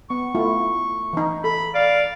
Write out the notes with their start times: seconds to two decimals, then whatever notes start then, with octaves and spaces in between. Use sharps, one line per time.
0.10 B3 C#6
0.35 A3 E4 F4
1.13 E3 D#4
1.44 A4 B5
1.75 D5 F5